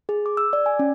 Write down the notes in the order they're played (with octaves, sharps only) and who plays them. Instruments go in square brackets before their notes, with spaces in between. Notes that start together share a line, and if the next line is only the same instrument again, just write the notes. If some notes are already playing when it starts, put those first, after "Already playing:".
[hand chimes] G#4
D6
E6
D5
G#5
C#4